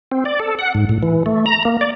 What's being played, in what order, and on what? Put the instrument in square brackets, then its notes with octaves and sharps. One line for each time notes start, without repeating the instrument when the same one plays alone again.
[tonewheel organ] C4
D5
A4
F#5
G#2
A2
E3
A3
A#5
A#3
D5